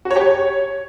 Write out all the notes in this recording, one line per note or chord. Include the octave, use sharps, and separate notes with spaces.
F#4
C#5
G4
C#5